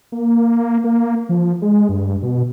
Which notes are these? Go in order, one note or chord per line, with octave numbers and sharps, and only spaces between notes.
A#3
A#3
F3
G#3
G2
B2